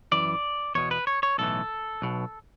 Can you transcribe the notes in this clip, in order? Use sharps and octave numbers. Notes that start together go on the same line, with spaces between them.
F#2 E3 D5
E2 B2 C#5
B4
C#5
C#5
B1 A2 E3 A4
B1 B2